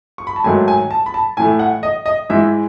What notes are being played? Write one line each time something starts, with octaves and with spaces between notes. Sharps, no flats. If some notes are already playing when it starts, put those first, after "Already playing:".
C#6
B5
A5
G#2 D#3 F#3 A3 G#5
G#5
A5
B5
A5
A2 E3 A3 G#5
F#5
D#5
D#5
G#2 E3 G#3 E5